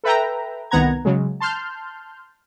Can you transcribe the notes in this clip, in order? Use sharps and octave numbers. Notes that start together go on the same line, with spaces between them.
A4 B4 E5 G5 A#5
C2 D#3 B3 F#5 A#5 G#6
C#3 F#3 G#3
A5 C6 F6 G6